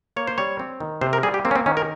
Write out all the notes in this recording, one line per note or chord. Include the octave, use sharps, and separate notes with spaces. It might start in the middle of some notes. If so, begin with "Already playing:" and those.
A#3 C#5
C5
G3 C#5
C4
D#3
C3 C5
A#4
G3 G#4
G4
A#3 C4
C#4
C4
D#3 C#4
A#4